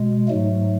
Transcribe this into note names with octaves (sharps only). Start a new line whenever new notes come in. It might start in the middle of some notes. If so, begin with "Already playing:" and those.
Already playing: B2 G#3
G#2 F#3 A3